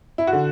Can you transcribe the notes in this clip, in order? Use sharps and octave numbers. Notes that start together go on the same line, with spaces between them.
E4
F#4
D3